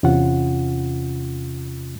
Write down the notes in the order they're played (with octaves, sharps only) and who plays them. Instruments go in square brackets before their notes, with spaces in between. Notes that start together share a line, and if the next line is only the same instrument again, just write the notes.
[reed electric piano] E2 C3 C#4 F4 F#5